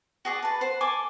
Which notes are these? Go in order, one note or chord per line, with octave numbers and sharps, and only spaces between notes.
F#4 G#4 D5
B4 A5
C5 F#5
A4 G#5 D6